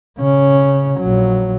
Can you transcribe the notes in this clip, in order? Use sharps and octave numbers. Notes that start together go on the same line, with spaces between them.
C#3 C#4
A#1 F#3